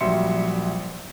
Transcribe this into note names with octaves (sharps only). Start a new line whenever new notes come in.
A#1 F#3 G3 E5 C6 C#7